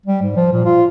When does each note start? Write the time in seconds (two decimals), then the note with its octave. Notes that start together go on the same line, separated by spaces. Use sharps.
0.06 G3
0.22 G#2
0.36 F3
0.52 A#2
0.65 F4